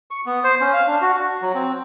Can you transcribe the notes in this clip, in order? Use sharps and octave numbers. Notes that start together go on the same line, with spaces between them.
C#6
B3
C5
C#4
F5
D4
F#4
F#4
F#3
C4